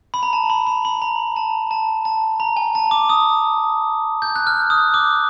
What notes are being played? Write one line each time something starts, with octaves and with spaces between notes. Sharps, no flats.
B5
A#5
A5
B5
B5
B5
A#5
A5
A5
A5
A#5
G#5
A5
D6
D#6
G6
F#6
F6
D#6
D6